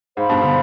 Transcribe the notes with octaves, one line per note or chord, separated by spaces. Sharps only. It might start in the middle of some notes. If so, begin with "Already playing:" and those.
G#2 C5 F5 B5
G2 B2
B2 D3